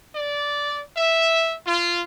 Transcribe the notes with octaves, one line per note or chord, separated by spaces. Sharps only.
D5
E5
F4